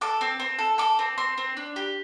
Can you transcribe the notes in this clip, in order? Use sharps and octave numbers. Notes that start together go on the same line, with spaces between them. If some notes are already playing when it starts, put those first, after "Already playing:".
A4 D6
C4
C4
A4
A4 D6
C4
C4 C6
C4
D4
G4